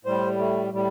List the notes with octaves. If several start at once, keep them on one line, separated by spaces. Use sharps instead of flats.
A2 G3 C5
A3
A2 G3